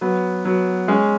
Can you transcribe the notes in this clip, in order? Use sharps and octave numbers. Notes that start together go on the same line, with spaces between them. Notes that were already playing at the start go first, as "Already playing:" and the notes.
F#3 B3
F#3 B3
G#3 C#4